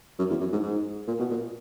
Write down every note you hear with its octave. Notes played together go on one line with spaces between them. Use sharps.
F#2
E2
F#2
G#2
G#2
A#2
B2
A#2